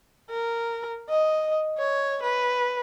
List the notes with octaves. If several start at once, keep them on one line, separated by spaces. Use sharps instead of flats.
A#4
D#5
C#5
B4